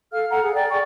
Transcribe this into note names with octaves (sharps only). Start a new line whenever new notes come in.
A4 F5 F6
A4 F#5 A#5
G#4
D5 G5
G5 C#6